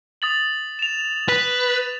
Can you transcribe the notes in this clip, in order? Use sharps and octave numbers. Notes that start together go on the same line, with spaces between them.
D#6 A6 F#7
E7 F7
B4